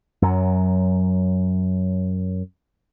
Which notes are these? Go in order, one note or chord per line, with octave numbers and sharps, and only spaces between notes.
F#2 F#3